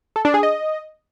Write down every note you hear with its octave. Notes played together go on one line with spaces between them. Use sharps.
A4
D4
G#4
D#5